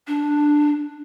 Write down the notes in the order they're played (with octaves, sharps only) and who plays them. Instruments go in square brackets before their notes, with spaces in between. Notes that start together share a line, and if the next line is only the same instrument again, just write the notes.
[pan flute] D4